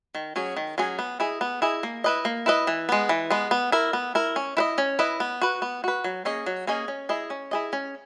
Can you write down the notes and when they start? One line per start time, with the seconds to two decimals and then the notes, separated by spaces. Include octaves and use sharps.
0.15 D#3
0.36 F#3 C#4 G#4
0.57 D#3
0.78 F#3 C#4 G#4
0.99 B3
1.20 E4 G#4 D#5
1.41 B3
1.62 E4 G#4 D#5
1.83 A#3
2.04 E4 B4 D#5
2.25 A#3
2.46 E4 B4 D#5
2.67 E3
2.89 G#3 B3
3.09 E3
3.31 G#3 B3
3.51 B3
3.72 E4 A#4
3.93 B3
4.15 E4 A#4
4.36 C#4
4.57 E4 B4 D#5
4.78 C#4
4.99 E4 B4 D#5
5.20 B3
5.41 F#4 B4
5.62 B3
5.84 F#4 B4
6.04 F#3
6.25 A#3 C#4 G#4 D#5
6.46 F#3
6.67 A#3 C#4 G#4 D#5
6.88 C#4
7.09 E4 G#4 D#5
7.30 C#4
7.51 E4 G#4 D#5
7.73 C#4